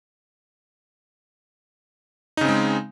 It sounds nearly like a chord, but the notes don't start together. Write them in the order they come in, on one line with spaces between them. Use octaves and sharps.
D#4 C#3 C4 G#3